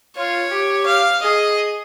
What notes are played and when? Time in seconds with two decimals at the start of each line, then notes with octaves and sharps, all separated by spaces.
0.16 F4 C#5
0.51 G4
0.86 F5
1.23 G#4 D#5